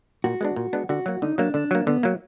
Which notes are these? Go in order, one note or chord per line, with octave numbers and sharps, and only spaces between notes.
A#2 F#4
G#3 B3 D4
A#2
G#3 B3 D4
D3 F#4
F#3 A#3
D3 D#4
F#3 A#3 D4
D3 D4
F#3 A#3
D3 B3
F#3 A#3